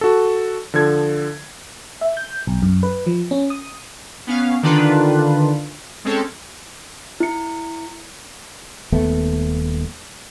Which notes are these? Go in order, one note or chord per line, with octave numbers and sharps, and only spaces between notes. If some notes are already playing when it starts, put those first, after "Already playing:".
F#4 A4
D3 F3 A4 G#6
E5
G6
B1
F#2
B4
F3
C#4
D#6
B3 C#4 F5
D3 D#3 D4 D#4 F4 B4
G#3 C4 C#4 A4
E4 C#7
D#1 D#2 A3 B3